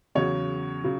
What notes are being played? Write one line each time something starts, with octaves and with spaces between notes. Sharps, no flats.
E2 C#3 F#3 C#5
C#3 F#3